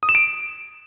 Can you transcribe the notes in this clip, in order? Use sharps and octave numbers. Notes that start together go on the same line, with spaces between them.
D#6
E7
D7